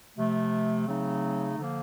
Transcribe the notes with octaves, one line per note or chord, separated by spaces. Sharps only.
C3 F3 A3
C#3 F#3 A3 C4 D#4
D3 F3 A#3